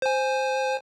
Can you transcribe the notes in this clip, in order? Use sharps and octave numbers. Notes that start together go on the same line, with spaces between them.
C5 G#5